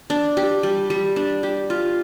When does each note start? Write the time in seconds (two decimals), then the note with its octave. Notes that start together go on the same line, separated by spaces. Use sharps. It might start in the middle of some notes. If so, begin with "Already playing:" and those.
0.10 D4
0.37 G4
0.63 G3
0.90 G3
1.16 D4
1.43 G4
1.70 F4